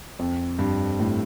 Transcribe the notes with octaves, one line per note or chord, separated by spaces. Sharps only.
F2
G2
A2